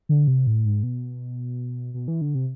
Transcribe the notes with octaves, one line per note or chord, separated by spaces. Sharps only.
D3
C3
A2
G#2
B2
B2
E3
D3
C3